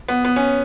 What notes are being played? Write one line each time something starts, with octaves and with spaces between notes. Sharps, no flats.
B3
B3
C#4